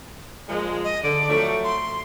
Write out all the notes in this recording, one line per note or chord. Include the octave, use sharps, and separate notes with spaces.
A#2 F3 G#3
D#5
D3 D5
F3 F#3 A3
C6